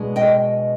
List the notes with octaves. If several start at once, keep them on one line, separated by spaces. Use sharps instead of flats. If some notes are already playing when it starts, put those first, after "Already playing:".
Already playing: B2 G#3 D4
D#5 G5